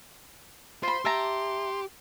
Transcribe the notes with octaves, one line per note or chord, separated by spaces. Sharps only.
F4 C5 B5 C6
G4 E5 A5 A#5